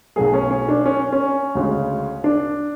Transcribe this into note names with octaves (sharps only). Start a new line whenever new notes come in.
B1 B2 F#3 A3 G#4
C#4
C#4
D4
C#4
C#4
D2 C#3 G#3
D4